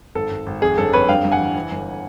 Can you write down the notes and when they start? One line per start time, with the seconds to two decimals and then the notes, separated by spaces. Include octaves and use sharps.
0.15 G#1 A4
0.31 G#1
0.46 G#1
0.61 F2 G#4
0.78 G1 A4
0.93 F2 B4 C#5
1.08 G2 F5 G5
1.25 G2
1.32 F#5 G#5
1.40 E3
1.56 E3
1.71 G1